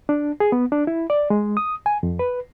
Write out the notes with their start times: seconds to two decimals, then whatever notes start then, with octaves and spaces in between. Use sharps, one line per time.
0.09 D4
0.40 G#4
0.52 B3
0.72 D4
0.87 E4
1.10 D5
1.30 G#3
1.57 D#6
1.86 G#5
2.03 F2
2.19 B4